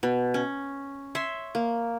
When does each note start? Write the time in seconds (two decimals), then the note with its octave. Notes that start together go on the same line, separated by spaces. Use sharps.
0.03 B2
0.34 C#4
1.15 C#5 E5 C6
1.55 A#3